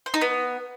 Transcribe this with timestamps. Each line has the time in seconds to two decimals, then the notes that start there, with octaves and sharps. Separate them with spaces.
0.06 C5
0.14 D#4
0.21 B3